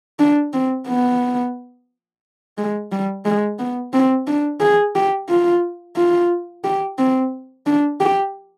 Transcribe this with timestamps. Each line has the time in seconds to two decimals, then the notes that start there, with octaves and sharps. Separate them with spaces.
0.19 D4
0.53 C4
0.88 B3
2.58 G#3
2.92 G3
3.25 G#3
3.59 B3
3.93 C4
4.27 D4
4.60 G#4
4.96 G4
5.29 F4
5.96 F4
6.64 G4
6.99 C4
7.66 D4
8.00 G4